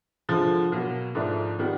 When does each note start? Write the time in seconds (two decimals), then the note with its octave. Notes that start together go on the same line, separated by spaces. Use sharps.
0.29 D3 F3 G#3
0.72 B2 F#3 A#3
1.15 G#2 F3 A3 D4
1.59 D#3 G3 B3